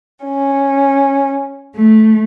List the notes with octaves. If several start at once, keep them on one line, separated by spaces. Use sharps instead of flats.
C#4
A3